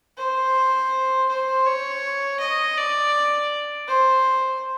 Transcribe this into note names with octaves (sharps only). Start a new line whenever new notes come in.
C5
C5
C#5
D#5
D5
C5